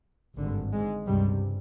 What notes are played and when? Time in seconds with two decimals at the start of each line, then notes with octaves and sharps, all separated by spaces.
0.37 G#1 G2 D3
0.72 G#2 G#3
1.07 C#2 G2 C3 G3